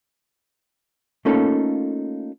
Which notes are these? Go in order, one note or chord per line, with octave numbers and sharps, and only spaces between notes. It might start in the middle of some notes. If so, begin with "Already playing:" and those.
A3 A#3 C#4 D#4 F4 A4